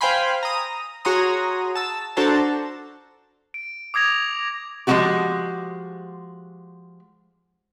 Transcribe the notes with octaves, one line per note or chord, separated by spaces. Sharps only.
C5 F5 G5 G#5 B5 C6
A#5 D#6
F#4 G#4 C#5 A#5 C6 D#6
A5 E6
D4 F#4 A4 C5 A5 A#5
D7
D6 D#6 G#6 A#6 F7
F3 G#3 D#4 E4 F#4 G4